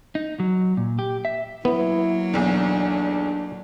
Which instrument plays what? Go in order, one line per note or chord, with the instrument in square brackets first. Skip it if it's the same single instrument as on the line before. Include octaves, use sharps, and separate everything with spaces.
[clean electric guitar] D#4
F#3
A#2
G4
E5
[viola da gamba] F#3 A#3 [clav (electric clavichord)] B3 [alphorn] E4
[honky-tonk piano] B1 E2 [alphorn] D4